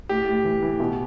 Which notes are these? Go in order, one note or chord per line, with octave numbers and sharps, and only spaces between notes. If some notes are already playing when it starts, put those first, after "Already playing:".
A2 G4
A2
E3
E3
B2